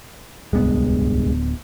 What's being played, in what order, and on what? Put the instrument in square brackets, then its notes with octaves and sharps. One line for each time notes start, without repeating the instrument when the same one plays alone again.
[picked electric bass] D1 B3 [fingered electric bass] C2 G2 G#3